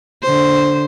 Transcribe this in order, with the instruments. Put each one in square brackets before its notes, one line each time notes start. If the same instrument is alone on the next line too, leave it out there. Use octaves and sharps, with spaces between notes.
[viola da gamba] D3 C5